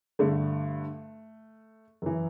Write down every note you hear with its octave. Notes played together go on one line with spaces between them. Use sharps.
G2 D3 A3
F#2 E3